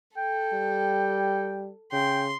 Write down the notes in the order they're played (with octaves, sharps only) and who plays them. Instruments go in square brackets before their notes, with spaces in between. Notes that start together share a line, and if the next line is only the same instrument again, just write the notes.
[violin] A4 [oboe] G5
[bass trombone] G3
[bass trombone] C#3 [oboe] G5 [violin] C6